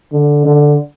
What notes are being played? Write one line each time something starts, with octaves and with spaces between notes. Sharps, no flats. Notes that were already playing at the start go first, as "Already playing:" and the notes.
D3
D3